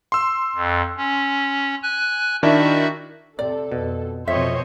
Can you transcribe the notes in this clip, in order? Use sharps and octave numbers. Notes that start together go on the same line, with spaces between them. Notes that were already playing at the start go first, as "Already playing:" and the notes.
C6 E6
F2
C#4
G#5 F#6
D#3 D4 E4 F#4 E5
C3 A4 D5
F2 B2
F2 B2 F3 C4 C5 C#5 D#5 E5